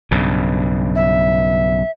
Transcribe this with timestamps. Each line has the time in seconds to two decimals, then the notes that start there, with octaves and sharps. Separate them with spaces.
0.11 B1 G2 C#3
0.96 E5